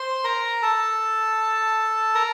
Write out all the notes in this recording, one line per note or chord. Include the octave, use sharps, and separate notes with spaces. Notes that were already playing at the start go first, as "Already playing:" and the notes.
Already playing: C5 C6
A#4 A#5
A4 A5
A#4 A#5